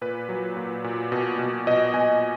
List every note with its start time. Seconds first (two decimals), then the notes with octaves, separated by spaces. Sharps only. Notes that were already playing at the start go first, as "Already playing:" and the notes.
0.01 A#2 B4
0.29 F#3
0.57 A#2
0.84 A#2
1.12 B2
1.39 B2
1.67 B2 D#5
1.94 B2 G#5